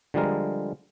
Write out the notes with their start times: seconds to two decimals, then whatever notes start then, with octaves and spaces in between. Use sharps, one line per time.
0.14 D3 F3 G3 G#3 A#4